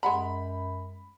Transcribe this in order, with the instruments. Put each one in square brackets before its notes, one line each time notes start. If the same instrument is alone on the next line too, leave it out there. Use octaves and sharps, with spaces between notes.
[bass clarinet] F#2 [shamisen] G#3 F#5 A#5 [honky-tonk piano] B5